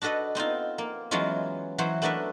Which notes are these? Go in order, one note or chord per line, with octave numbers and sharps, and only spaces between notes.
D4 F#4 A4 B4 D#5
B3 C4 D#4 F4
A#3
E3 F#3 G#3 B3 C#4 F4
E3 F#3 F#4 C5
A3 B3 D4 A#4 B4 E5